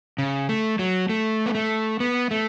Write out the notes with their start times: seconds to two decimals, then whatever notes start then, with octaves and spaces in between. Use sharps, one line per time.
0.18 C#3
0.49 A3
0.79 F#3
1.09 A3
1.46 B3
1.55 A3
2.00 B3
2.31 A3